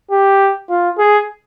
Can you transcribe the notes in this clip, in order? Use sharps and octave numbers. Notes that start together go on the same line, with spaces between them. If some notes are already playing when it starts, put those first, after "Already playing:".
G4
F4
G#4